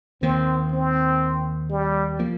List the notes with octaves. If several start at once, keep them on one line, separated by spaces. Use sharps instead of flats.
D#2 D#3 A#3 C4
C4
G3
F3 A#3